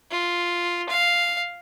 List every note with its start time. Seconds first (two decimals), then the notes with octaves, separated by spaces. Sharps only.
0.11 F4
0.89 F5